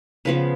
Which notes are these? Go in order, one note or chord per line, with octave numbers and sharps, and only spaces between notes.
C#3 F3 B3 B4